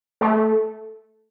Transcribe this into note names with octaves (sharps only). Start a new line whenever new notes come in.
A3